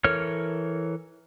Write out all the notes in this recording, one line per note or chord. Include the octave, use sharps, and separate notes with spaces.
E3 A4 A#4 C#5 F6